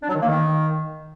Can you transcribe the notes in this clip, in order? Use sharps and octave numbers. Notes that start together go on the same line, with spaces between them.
D4
F#3
D#3
A#3
D#3